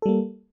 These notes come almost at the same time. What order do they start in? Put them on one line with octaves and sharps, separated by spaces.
A4 G3 A#3